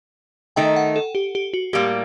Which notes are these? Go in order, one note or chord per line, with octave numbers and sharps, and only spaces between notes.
D#3 A3 D#4 G5
F#5
A4
G4
G4
F#4
A2 G3 A#3 G4